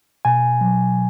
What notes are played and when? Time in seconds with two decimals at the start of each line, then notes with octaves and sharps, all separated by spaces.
0.25 B2 G#5
0.61 F#3